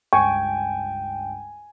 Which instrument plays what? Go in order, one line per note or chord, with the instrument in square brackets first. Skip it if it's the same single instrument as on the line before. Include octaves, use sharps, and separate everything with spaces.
[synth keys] C#2 G2 [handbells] G5 [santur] G#5 [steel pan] C#6